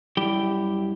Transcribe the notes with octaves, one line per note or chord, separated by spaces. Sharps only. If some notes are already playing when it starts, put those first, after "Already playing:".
F#2 G3 E4 G4 G5